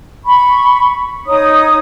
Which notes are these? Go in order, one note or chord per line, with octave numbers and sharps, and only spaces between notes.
B5 C#6
D#4 C#5 D#6